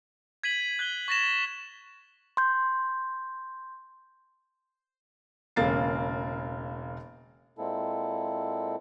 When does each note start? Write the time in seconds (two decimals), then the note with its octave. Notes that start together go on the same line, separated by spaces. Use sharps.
0.44 G#6 B6 D#7 F#7
0.79 F#6 G#6 G7
1.08 C#6 A6 A#6 E7
2.37 C6 G6
5.56 E1 C#3 A#3 A6 C7
7.58 A#2 G#3 A#3 C4 E4 A4